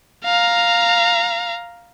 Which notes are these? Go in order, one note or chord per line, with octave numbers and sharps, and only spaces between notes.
F5 A#5